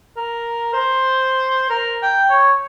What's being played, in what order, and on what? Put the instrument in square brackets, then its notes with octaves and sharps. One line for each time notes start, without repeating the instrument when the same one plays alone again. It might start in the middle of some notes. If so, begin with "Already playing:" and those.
[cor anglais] A#4
C5
A#4
G5
C#5